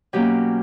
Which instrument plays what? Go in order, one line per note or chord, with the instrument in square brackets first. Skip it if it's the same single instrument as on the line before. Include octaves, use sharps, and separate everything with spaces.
[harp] B2 F#3 A#3 C#4 G4